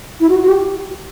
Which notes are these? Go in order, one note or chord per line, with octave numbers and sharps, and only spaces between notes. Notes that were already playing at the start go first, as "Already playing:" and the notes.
E4
F#4
F#4
G4